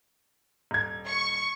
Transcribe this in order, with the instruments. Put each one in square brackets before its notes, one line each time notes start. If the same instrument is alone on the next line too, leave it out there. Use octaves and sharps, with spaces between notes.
[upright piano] D#1 G#6
[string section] C#6